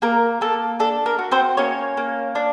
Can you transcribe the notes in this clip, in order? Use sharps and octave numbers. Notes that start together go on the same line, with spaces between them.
A#3 A#4
A#3 A4
D4 A4
A#4
F#4
C4 C5
A#3 C#4 C#5
A#3
D4